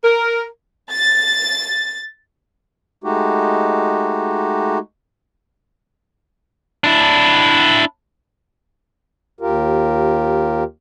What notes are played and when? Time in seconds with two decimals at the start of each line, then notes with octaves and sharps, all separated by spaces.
0.03 A#4
0.91 A6
3.04 G#3 A3 D#4 F#4 G4
6.84 D4 E4
9.41 D#2 F4 G4 A#4